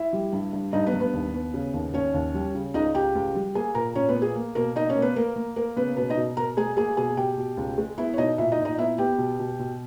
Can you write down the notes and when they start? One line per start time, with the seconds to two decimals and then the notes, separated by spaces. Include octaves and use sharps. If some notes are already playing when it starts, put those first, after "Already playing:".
Already playing: E4 E5
0.13 G3
0.33 G2
0.53 G2
0.73 G2 D#4 D#5
0.87 B3 B4
0.94 G2
1.00 B3 B4
1.13 D#2
1.34 B3
1.54 C#3
1.74 D#2
1.94 D#2 C#4 C#5
2.14 D#2
2.34 G3
2.55 C#3
2.74 C#2 D#4 D#5
2.94 C#2 G4 G5
3.15 C#2
3.35 G3
3.55 A#3 G#4 G#5
3.75 A#2 A#4 A#5
3.95 A#2 C#4 C#5
4.09 B3 B4
4.16 A#3
4.22 G#4
4.36 A#3
4.55 B2 A#3 A#4
4.76 A#3 D#4 D#5
4.89 C#4 C#5
4.96 A#3
5.02 B3 B4
5.16 A#3 A#4
5.36 A#3
5.56 A#3 A#4
5.76 C#3 B3 B4
5.97 B2 B3 B4
6.09 D#4 D#5
6.16 B2
6.37 B2 A#4 A#5
6.57 G#3 G#4 G#5
6.77 A#3 G#4 G#5
6.97 B2 G#4 G#5
7.17 B2 G4 G5
7.38 B2
7.57 C#2
7.78 G#3
7.98 B3 E4 E5
8.14 C#5
8.18 B2 D#4 D#5
8.38 A#2 E4 E5
8.52 D#4 D#5
8.59 A#2
8.65 D#4 D#5
8.78 B3 E4 E5
8.98 B3 G4 G5
9.18 B2
9.39 B2
9.59 B2